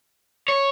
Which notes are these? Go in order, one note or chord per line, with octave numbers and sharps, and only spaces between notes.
C#5